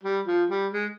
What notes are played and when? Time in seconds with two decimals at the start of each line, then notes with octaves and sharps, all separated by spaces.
0.03 G3
0.27 F3
0.50 G3
0.73 G#3